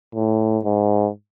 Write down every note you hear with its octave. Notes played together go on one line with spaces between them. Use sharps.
A2
G#2